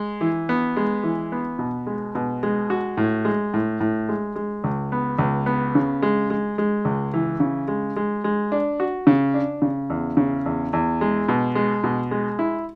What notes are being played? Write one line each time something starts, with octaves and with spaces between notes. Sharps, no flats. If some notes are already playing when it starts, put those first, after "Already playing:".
Already playing: G#3
E3
B3
G#3
E3
B3
B2
G#3
B2
G#3
F#4
A2
G#3
A2
A2
G#3
G#3
C#2
B3
C#2
B3
C#3
G#3
G#3
G#3
C#2
E3
C#3
G#3
G#3
G#3
D4
F#4
C#3
D4
C#3
E2
C#3
E2
E2
G#3
B2
G#3
B2
G#3
E4